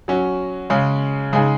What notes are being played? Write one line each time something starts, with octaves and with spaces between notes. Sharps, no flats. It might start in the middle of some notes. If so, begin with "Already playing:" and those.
F#3 C#4 F#4
C#3 G#3 C#4
C#3 G#3 D#4 G#4